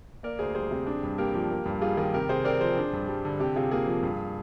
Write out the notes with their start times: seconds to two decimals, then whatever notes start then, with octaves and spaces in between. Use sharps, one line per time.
0.23 A#3 A#4 D5
0.39 D2 G#4 C5
0.55 G3 G#4 C5
0.71 C3
0.87 D4
1.03 G2
1.18 A#3 G4 A#4
1.34 F3
1.51 A#3
1.66 G2
1.81 G3 F4 G#4
1.97 D#3 F4 G#4
2.14 C3 G4 A#4
2.29 C3 G#4 C5
2.45 C4 A#4 D5
2.61 F3 G#4 C5
2.77 D4
2.93 G2
3.09 G3
3.25 D3
3.40 C3 G4
3.56 C3 F4 G#4
3.71 A#3 F4 G#4
3.87 F3
4.03 G2